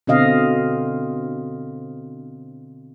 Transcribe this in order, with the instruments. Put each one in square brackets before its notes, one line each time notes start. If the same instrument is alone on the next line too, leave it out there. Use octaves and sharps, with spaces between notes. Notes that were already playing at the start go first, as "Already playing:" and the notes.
[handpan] B2 D3 C4 D#5 F5